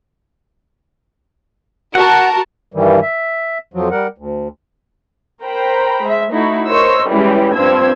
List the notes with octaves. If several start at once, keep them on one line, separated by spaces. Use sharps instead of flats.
F#4 A#4 F#5 A5
G2 D#3 E3 G3
E5
F2 F3 F#3
G3 A#4 F#5
D2
A#4 C5 G5 A#5 B5
G#3 E5
A3 D#4 E4 F#4
A#4 C5 C#5 D#5 C#6 E6
E3 G3 G#3 C#4 E4 G4
G2 F3 C4 C5 E6 G#6